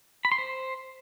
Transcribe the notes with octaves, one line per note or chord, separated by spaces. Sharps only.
B5
C6
C5